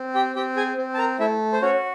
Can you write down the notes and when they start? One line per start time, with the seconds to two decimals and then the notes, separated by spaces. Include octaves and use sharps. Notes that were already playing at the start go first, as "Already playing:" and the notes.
Already playing: C4
0.15 G4 G5
0.36 C4 G4 G5
0.56 G#4 G#5
0.78 C4
0.94 A5
0.98 A#4 A#5
1.19 A3 E4 E5
1.53 C5
1.62 C#4 F#4 C#5